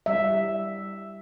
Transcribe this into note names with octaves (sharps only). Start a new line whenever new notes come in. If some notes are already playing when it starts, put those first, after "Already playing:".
G3 E5